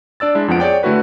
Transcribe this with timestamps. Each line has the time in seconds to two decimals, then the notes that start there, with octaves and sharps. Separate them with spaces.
0.20 D4 D5 E6 A6
0.35 G#3 D4 E4
0.48 F2 F3 B3 F#5 D7
0.60 G#4 C#5 D5 G5
0.83 D3 A3 E4 F#4 B4